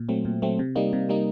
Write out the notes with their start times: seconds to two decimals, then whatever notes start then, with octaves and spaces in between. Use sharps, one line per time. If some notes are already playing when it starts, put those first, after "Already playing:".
Already playing: A#2
0.09 F#3 A3 C4
0.25 A#2
0.42 F#3 A3 C4
0.59 C3
0.76 G3 A#3 D#4
0.93 C3
1.09 G3 A#3 D#4